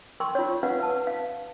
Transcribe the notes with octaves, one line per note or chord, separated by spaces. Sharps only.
A#4 G5 C6 C#6
F4 C#5
A#4 B4 F5 F#5
B4 A5
F5